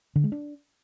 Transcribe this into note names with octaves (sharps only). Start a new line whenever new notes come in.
D3
G#3
D4